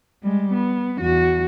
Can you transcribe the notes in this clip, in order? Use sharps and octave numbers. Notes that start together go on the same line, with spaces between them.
G3 G#3
B3
E2 F#4